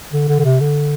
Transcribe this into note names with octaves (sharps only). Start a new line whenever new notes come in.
D3
D3
D3
C3
D3